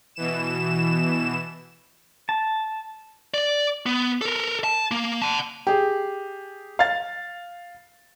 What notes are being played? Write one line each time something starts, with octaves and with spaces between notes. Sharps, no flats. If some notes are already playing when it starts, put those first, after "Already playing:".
B2 E3 E7
A5
D5
B3
A4 A#4
A5
A#3
F#5 A5
G4 G#4
F5 A6